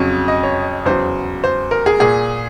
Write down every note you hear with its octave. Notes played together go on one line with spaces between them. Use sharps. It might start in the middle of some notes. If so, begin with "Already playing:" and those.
Already playing: F2 C#3 F#3 C#5
D#5
C#5
E2 C#3 F#3 C5
C5
A#4
G#4
A#2 G#4